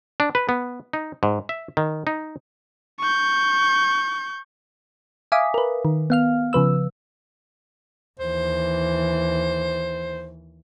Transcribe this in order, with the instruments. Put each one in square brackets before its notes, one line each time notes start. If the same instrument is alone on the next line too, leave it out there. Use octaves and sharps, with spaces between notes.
[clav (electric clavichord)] D4
B4
B3
D#4
G#2
E5
D#3
D#4
[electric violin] C#6 G6
[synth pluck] E5 F5 G#5 D6 D#6 B6
A#4 B4
D#3
B3 F5 F6
C#3 F3 B4 E6
[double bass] D#2 E3 [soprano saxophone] C5